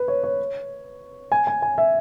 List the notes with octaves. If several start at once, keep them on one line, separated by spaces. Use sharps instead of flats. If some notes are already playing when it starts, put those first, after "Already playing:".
Already playing: B4
C#5
C#5
G#5
G#5
G#5
E5